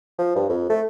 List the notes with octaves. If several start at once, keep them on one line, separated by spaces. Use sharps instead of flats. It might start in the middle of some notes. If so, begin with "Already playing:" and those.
F3
G2
F2
A3